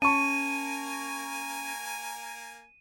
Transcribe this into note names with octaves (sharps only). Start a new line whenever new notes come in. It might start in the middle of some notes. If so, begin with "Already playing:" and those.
A#3 C#4 A#4 G#5 A5 C#6 D#7